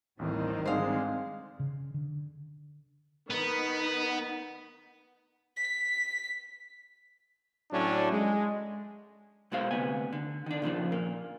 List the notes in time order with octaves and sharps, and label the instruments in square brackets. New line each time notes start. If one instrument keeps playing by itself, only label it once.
[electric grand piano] A1 D#2 A2 [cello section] D#3 G3 C4
[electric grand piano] G#2 [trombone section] D3 G#3 [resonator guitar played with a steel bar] C5 F5
[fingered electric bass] C#3
D3
[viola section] D#3 D#4 B5 [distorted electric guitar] B3
[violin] B6
[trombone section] A2 F#3 A3 C#4 D4
G#3
[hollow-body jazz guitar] B2 G#3 F#4 C5 F5
D2 C3 B3 G#5
D3
D#3 D4
A#2 C#3 F3 D4
A#2 A#3